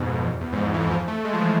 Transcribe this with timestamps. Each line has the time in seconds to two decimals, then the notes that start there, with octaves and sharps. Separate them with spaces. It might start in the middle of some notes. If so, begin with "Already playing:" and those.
Already playing: F2 G#2 B2
0.23 E2
0.41 E2
0.53 G#2
0.57 F2
0.74 E3
0.91 F3
1.08 A3
1.25 G#3
1.34 F3
1.41 E3